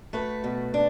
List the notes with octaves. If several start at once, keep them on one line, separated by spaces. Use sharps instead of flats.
A3 F#4 B4
B2
D4